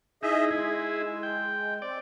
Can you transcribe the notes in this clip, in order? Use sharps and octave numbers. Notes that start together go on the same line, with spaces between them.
D#4 E4 G#4 D#5 E5
G#3 E4 G#4
G5
C4 D5